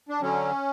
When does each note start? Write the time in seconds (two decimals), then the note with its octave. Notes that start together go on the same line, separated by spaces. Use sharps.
0.09 D4
0.21 D3 F#3 C#4